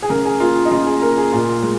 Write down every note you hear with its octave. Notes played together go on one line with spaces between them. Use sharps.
G#4
C#3 A#4
G#4
A#3 F4
D#4
C#3 F4
G#4
A#3 A#4
G#4
A#2 F4
G#3